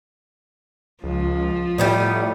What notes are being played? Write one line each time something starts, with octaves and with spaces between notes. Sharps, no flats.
C#2 F3
A2 G3 B3 D#4